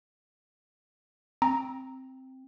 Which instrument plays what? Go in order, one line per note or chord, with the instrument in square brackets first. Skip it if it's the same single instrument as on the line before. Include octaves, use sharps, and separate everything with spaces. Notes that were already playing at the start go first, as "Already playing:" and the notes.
[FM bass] C4 [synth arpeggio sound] A#5